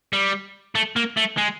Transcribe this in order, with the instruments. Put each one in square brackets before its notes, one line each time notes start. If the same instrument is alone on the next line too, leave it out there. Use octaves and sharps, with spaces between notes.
[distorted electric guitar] G3
A3
A#3
A3
G#3